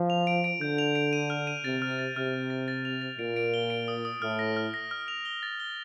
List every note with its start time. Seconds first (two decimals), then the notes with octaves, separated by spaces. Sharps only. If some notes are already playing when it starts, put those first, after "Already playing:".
Already playing: F3
0.10 F7
0.27 D7
0.44 D7
0.61 D3 G6
0.78 F7
0.95 D7
1.13 D#7
1.30 F6
1.47 D#7
1.64 C3 A6
1.82 F6
1.99 A6
2.16 C3 F6
2.34 F6
2.50 A6
2.68 A6
2.85 F7
3.02 A6
3.19 A#2 D7
3.36 D7
3.54 G7
3.70 D7
3.88 D#6
4.05 D#6
4.22 A2 F6
4.39 A#6
4.57 F6
4.74 A#6
4.91 F6
5.08 F7
5.25 G7
5.43 A6
5.60 G7